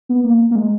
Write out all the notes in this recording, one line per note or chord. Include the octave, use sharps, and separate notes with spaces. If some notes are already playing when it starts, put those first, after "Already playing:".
B3
A#3
A#3
G#3